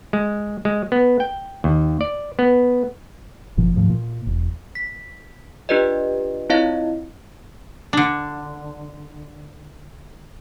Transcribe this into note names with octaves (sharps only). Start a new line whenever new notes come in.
G#3
G#3
B3
G5
D#2
D5
B3
F#1 A#2 F3
D2 G#2 F3
A#2
E1
B6
D4 F4 G4 B4 D5 D#5
C4 E4 F4 C#5 D#5 F5
D3 D4